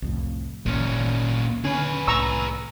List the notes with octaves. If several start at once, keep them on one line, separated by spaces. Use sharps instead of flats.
C2 F2 A2
G#1 C#2 A#2 E3 C#4
D3 C#4 G#4 B4
C2 A2 A#5 C#6 E6